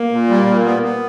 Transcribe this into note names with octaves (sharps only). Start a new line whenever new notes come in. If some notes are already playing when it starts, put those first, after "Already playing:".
Already playing: A#3
A#2
G3
A#2
B3
B3